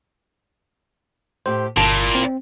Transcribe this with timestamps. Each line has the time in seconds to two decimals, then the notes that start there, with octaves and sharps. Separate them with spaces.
1.46 A2 G4 C5
1.77 G1 A#2 E4 A5
2.15 C4